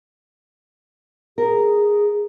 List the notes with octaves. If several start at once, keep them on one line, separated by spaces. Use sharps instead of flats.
G#4 A#4